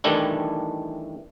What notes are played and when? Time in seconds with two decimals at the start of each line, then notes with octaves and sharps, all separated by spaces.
0.04 D#3 E3 G3 A3 D4 E4